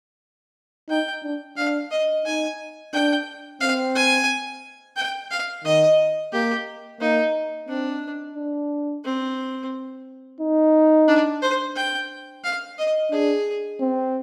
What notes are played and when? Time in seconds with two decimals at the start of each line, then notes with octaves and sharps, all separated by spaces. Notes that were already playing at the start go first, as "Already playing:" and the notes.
0.89 D#4 G5
1.23 D4
1.57 D4 F5
1.91 D#5
2.26 D#4 G#5
2.93 D4 G5
3.61 C4 F5
3.95 G#5
4.96 G5
5.31 F5
5.64 D#3 D#5
6.32 A#3 G4
7.01 A#3 D#4
7.68 C4 D4
8.36 D4
9.04 C4
10.41 D#4
11.08 D4
11.42 C5
11.76 G5
12.44 F5
12.78 D#5
13.11 D4 G#4
13.80 C4